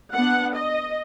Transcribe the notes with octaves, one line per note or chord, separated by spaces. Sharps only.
B3 D4 F#5
D#5